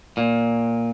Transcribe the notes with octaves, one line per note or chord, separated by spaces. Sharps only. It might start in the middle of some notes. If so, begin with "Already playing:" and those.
A#2